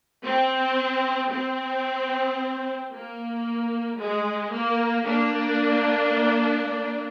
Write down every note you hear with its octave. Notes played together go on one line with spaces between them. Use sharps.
C4
C4
A#3
G#3
A#3
A#3 D4